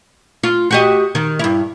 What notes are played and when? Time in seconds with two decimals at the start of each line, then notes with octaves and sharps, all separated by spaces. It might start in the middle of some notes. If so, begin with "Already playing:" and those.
0.43 F4
0.71 F#4 G4 D#5
1.15 D#3
1.39 G2 E4